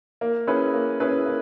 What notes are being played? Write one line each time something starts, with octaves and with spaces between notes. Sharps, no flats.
A#3
C#4 E4 G#4 B4
A#3
C#4 E4 G#4 B4
A#3